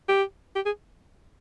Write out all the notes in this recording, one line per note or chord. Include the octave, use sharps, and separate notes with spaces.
G4
G4
G#4